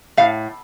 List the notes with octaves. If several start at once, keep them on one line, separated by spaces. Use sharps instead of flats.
A2 F5